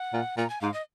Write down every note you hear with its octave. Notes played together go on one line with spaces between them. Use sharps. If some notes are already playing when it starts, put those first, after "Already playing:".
Already playing: F#5
A#2
A#2 A#5
G#5
G#2 F5
D#5